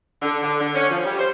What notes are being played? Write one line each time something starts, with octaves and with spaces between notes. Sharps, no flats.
D3
D3
D3
C#4
F3
G3
C5